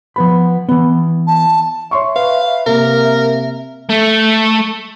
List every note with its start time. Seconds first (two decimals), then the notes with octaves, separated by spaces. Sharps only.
0.16 F3 B3 B5
0.69 E3 B3
1.27 A5
1.91 C#5 E5 C6 C#6
2.16 B4 F5
2.66 C3 A#3 A#4
3.89 A3